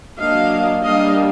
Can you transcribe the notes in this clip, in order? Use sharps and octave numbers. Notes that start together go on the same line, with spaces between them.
F#3 A#3 D4 D#5 F5
G3 A#3 D4 D#5 F5